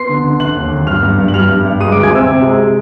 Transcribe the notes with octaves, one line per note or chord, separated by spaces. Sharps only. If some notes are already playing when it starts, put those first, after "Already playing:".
Already playing: B3 C6 C7
D3
D3
D3 F#6 F#7
D#2
D3
G2 F6 F7
G2
G2
F#7
G3 F6 F7
G2
G2
G#3 D#6 D#7
D6 D7
D2
G#5 G#6
C3 E5 E6
C3
G#3